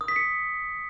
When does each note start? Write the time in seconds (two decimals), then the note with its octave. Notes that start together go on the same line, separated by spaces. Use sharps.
0.01 D#6
0.08 B6
0.16 C#7